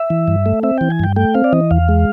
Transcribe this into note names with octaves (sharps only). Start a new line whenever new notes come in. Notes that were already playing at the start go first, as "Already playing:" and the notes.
Already playing: E5
E3
G2
A3
C4 E5
E3 G5
G#5
G2 G5
A3 G5
C4 F5
D5
E3 D#5
E2 F5
G#3